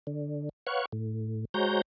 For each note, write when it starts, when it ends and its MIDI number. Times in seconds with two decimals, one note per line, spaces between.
0.07 0.49 50
0.67 0.85 71
0.67 0.85 73
0.67 0.85 77
0.67 0.85 78
0.67 0.85 85
0.92 1.45 45
1.54 1.81 56
1.54 1.81 66
1.54 1.81 72
1.54 1.81 73
1.54 1.81 82
1.54 1.81 91